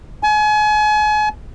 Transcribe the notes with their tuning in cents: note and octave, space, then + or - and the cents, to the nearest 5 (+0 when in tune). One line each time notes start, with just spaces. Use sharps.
G#5 +35